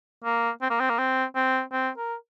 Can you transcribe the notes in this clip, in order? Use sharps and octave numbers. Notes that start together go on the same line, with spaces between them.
A#3
C4
A#3
C4
A#3
C4
C4
C4
A#4